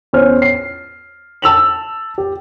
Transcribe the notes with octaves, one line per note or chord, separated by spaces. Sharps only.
E2 C#4 C5 F6
C7
A5 E6 F7 F#7
G4